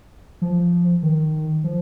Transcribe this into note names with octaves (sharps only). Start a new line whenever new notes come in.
F3
D#3
F3